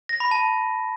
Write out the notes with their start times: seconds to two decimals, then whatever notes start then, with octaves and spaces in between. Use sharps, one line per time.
0.09 A#6
0.20 B5
0.31 A5